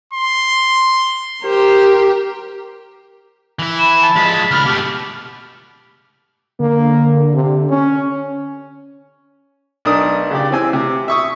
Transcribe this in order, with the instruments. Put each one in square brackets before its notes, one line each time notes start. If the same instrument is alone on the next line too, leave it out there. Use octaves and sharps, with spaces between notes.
[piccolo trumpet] C6
[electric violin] G4 A#4 [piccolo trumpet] C5
[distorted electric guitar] E3 E4
[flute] B5 [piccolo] E7
[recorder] A5
[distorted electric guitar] F3 G#3 [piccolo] B6
[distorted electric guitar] C#2 D4 [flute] B5 [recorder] F6
[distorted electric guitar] B2 A3 [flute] G4 [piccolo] D6
[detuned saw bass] D3 [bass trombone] A#3
[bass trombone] C3
C#4
[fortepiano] B1 D4 D#4 A#4 D#6
C#3 G4 D5
E3 C4 G#5 E6
C3
E5 C#6 D#6